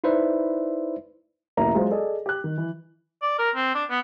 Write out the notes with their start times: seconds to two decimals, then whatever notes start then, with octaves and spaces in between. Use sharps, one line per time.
0.04 D#4 E4 B4 C5 D5 E5
1.57 E1 A1 A2 A#3 E5 A#5
1.74 F#3 G#3 F4 C5
1.91 G#4 A4 D5 D#5
2.26 G4 F#6
2.44 D#3
2.58 E3
3.22 D5
3.39 A#4
3.55 C4
3.75 D4
3.90 B3